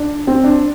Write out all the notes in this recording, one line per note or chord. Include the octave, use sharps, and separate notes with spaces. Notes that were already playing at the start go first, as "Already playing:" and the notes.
Already playing: D4
C4
D4